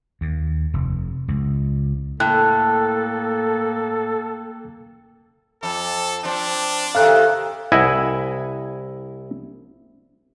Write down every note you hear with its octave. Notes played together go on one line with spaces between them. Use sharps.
D#2
F1
C#2
A2 A#3 A4 G5 F#6
F2 A4
F3 C4 D4
C3 D#3 A4 F5 F#6
C2 E4 D#5 F#5 G#5